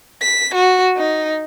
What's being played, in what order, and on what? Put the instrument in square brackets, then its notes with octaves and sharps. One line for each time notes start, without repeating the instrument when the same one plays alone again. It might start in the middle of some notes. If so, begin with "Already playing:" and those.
[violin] B6
F#4
D#4